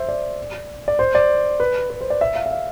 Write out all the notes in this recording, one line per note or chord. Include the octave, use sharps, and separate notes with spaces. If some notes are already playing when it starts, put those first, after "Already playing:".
Already playing: C5 E5
D5
D5
C5
D5
B4
B4
C5
D5
E5
F5
E5
F5